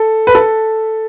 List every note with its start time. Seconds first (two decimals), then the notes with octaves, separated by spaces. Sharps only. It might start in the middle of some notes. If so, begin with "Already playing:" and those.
Already playing: A4
0.27 B4
0.35 A4